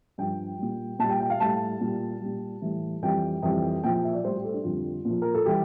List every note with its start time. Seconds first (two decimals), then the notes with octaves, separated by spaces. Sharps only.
0.18 G2 F3 G5
0.59 A#2 G3
0.99 A#2 G3 A5
1.10 G5
1.20 G5
1.30 F5
1.40 A2 G3 A5
1.81 A#2 G3
2.21 A#2 G3
2.61 A2 E3 G3
3.02 F2 E3 G3 G5
3.42 F2 E3 G3
3.84 A#2 F3 G5
3.94 G5
4.04 E5
4.14 D5
4.23 A2 G3 C5
4.37 G4
4.44 A4
4.54 D4
4.64 F2 D3 G3 F4
5.05 A#2 F3
5.22 A#4
5.34 A4
5.46 E3 G3 G4